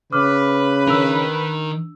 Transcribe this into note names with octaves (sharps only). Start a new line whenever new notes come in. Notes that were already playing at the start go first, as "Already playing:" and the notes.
C#3 B4 D6 D#6 F6
D#3 D4 A#4 E6